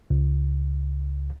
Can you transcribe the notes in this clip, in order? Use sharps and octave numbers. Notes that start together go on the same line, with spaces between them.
C#2